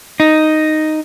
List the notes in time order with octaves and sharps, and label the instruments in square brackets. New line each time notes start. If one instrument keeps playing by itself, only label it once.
[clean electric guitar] D#4